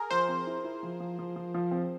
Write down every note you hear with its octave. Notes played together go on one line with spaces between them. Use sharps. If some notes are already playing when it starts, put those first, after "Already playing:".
Already playing: G#4 A#4
F3 C5
C4
E4
E4
F3
F3
F3
F3
F3
C4